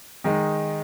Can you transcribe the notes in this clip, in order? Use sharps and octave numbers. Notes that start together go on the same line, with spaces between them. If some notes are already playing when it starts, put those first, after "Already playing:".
D#3 G#3 D#4